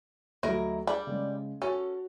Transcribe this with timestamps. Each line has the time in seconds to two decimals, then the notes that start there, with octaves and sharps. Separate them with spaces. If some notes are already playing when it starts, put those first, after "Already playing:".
0.43 D2 F#3 E4 A#4 D#5
0.87 G3 D4 G#4 B5
1.07 C#3 G#3
1.62 C#4 F#4 A4 C#5